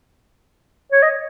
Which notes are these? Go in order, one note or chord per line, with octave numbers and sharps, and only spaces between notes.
C#5
D#5